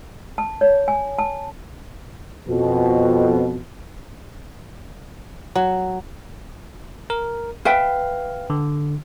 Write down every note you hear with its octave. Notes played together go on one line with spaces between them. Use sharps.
A5
C#5
G#5
A5
F2 B2
F#3
A#4
B4 E5 F5 G5
D3